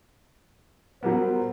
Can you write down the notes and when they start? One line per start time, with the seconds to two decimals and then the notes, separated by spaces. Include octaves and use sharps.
1.03 F#3 G3 B3 A#4 C5